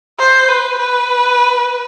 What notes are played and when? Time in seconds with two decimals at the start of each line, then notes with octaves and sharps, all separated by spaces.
0.19 C5
0.49 B4
0.79 B4